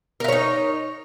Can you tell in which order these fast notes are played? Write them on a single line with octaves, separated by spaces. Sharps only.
A#4 E5 C#5 D#4